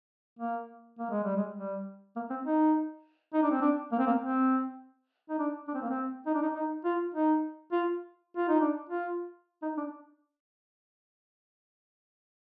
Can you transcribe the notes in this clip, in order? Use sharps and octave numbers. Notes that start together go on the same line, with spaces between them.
A#3
A#3
G#3
G3
G#3
G3
A#3
C4
D#4
D#4
D4
C4
D4
A#3
C4
A#3
C4
D#4
D4
D4
C4
A#3
C4
D#4
D4
D#4
D#4
F4
D#4
F4
F4
D#4
D4
F4
D#4
D4